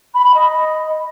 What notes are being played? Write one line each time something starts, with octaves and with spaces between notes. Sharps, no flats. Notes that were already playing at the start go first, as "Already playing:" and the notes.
B5
B5
D#5